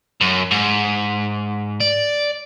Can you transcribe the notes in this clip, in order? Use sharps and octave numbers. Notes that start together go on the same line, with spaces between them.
F#2
G#2
D5